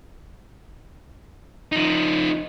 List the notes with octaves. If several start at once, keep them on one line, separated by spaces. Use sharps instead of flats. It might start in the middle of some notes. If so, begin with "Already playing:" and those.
F3 D#4